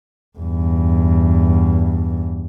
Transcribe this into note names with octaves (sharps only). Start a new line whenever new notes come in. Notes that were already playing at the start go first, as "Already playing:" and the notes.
E2 G2